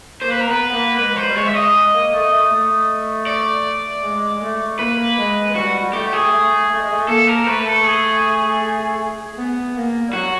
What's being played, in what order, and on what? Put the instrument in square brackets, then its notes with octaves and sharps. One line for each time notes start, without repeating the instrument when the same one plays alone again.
[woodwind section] A#3 [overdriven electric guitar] C5
[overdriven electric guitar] B4
A#4
[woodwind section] B3 [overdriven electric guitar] B4
[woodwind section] A#3
[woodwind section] G#3 [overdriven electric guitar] B4
[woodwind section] F3
[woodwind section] F#3 [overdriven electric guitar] C5
[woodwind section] G3
[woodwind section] G#3 [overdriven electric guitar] C#5
[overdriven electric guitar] E5
D#5
[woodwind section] A#3
A3
A3
A3
[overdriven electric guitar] D5
[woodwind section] G#3
A3
[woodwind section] A#3 [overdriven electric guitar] B4
[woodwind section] G#3
[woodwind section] G3 [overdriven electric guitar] F#4
[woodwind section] A3 [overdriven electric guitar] G4
[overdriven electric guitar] G#4
[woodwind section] A3
A3
G#3
A3
[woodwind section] A#3 [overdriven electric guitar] A4
[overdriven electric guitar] A#4
[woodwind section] A3 [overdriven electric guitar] B4
[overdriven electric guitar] A4
G#4
[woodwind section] B3
A#3
G3
[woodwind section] F#3 [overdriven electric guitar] F#4